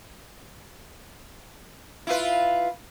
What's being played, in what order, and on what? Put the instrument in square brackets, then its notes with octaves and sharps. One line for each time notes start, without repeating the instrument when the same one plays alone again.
[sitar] E4 F4 B4